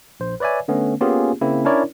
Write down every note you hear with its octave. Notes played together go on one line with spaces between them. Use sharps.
A#1 C5
B4 C#5 D5 E5 G#5
D3 A3 B3 C#4
A#3 B3 C#4 F4 G4 G#4
C#3 A#3 C4 E4
C#4 D4 E4 A#4 C#5 D5